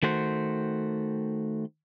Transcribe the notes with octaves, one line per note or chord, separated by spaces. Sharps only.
D#3 A3 F#4 C5